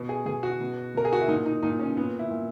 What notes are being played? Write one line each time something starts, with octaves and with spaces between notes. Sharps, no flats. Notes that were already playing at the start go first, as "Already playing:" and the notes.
Already playing: B2
G#4
B2 G#4
F#4
B2
B2 A#4
G#4
F#4
E4
A#2 D#4
D#4
A#2 D#4
C#4
A#2 B3
E4
A#2